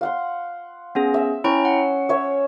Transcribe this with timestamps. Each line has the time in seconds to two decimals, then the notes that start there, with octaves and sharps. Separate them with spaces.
0.01 F5 F#5 C6
0.95 B3 C#4 G#4
1.14 E5
1.44 C#4 E4 G5 A#5
1.65 F#5
2.09 C#5 E5